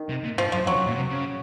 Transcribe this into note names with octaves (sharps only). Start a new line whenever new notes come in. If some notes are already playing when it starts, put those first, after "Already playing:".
Already playing: D#3
C3
A#2
G#2 F3
F#2 F3
F2 F#3
F#2
A#2
C3
C#3